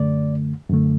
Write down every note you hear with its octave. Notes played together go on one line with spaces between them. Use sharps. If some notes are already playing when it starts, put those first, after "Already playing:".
Already playing: F#2 D3 A3 D5
F#2 D3 A3